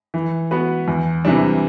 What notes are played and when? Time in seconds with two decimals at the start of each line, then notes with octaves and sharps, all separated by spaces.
0.14 E3
0.51 B3 F#4 B4
0.88 E2
1.25 C3 E3 G3 D4